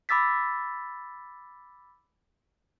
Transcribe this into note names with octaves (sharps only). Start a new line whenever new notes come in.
B5 D6 E6 A6 B6